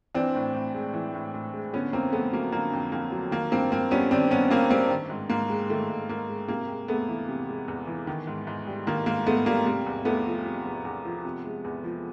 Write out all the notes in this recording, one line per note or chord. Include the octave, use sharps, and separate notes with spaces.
E3 C4 D4
A2
A2
G#3
E3
A2
A2
G#3
D3 B3 C#4
F2 A#3 C4
F2 A3 B3
F#3 A#3
D3 A#3
F2
F2 A#3
F#3
D#3 A#3
G2 A#3 C4
G2 A#3 C4
G3 B3 C#4
D#3 C4 D4
G2 B3 C#4
G2 A#3 C4
G3 A#3 C4
D#3
G#2
G#2 A#3
G#3
D#3 A3
G#2
G#2 A#3
G#3
C3 A#3
G#3
E2 A3 B3
E3
C3
G#3
E2
E3
D#3
G#2
G#2
G3
D#3 A#3
G#2 A#3
G#2 A3 B3
G3 A#3
C3 A#3
E2
E2 A3 B3
F3
C3
E2
E2
F3
C3
G#3
E2
F3